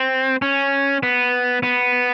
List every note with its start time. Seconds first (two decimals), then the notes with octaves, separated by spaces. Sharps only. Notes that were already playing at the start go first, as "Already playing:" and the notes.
Already playing: C4
0.42 C#4
1.03 B3
1.63 B3